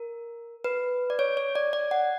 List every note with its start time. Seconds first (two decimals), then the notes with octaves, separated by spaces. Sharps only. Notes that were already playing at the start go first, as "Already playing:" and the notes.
Already playing: A#4
0.64 B4
1.10 D5
1.19 C#5
1.37 C#5
1.55 D5
1.73 D5
1.91 F#5